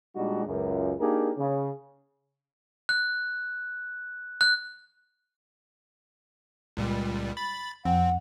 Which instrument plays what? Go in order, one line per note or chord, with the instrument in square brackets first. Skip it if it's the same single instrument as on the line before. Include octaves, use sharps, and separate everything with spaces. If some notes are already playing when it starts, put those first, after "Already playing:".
[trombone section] A#2 G3 G#3 D4 D#4 F#4
C#2 F#2
A#3 D4 D#4 G4 G#4 A#4
C#3
[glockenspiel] F#6
F#6
[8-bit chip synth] C#2 A#2 G3
B5 A6
[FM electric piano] F2 [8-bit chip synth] C4 [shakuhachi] F#5